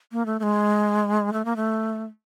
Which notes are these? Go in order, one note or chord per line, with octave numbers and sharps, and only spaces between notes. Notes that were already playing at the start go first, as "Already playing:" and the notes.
A#3
A3
A3
G#3
A3
A#3
A3